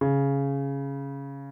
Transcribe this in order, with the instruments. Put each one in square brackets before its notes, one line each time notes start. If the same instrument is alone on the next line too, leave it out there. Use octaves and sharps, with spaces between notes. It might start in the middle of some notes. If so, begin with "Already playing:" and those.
[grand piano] C#3